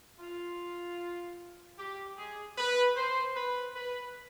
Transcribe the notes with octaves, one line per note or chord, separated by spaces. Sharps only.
F4
G4
G#4
B4
C5
B4
B4